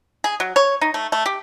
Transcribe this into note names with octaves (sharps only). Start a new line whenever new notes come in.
G#4
F#3
C#5
D#4
A3
A3
G4